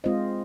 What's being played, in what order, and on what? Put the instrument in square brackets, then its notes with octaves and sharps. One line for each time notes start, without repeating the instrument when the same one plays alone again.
[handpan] G#3 C4 F4 C5 D#5